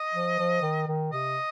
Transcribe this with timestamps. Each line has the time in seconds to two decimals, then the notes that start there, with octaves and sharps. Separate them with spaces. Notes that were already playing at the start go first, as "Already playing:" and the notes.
Already playing: D#5
0.14 F3
0.39 F3
0.62 D#3
0.88 D#3
1.12 C3 D#5